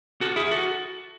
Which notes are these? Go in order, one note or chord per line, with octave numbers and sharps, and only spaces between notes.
F#4 A4
E4 G#4
F#4 A4